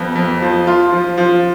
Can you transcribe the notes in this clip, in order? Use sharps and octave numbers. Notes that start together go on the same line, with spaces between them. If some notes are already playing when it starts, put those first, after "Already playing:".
Already playing: F2 B3
F2
F3
F4
F3
F3